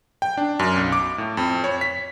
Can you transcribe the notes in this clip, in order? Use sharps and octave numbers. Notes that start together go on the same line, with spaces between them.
G5
D4
F#2
B1
D6
A2
F2
C#5
B6